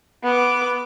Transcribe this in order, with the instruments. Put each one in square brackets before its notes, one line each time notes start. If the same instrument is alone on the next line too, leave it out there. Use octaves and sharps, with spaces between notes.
[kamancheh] B3 D6